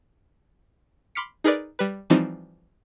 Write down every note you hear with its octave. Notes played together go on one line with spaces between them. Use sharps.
B5 C6 D6 F6 B6 C#7
D#4 G#4 A#4 B4 D5
G3 B4
E3 F3 G3 C4 D#4